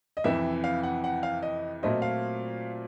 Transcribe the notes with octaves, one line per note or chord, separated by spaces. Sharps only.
D#5
F2 C3 E3 E5
F5
F#5
F#5
F5
D#5
A#2 F#3 A3 C4 F4 D#5
F5